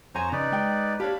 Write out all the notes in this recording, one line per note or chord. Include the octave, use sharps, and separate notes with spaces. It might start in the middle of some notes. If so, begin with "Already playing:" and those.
F2 C5 C#5 G#5 A#5
C#3 D#4 B4 D5
G#3 G5
D4 G4 C#5 F5 B5